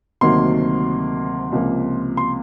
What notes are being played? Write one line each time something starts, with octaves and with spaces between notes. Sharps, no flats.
D2 C3 D#3 F#3 A#3 C6
C#2 C3 F3 A#3
C6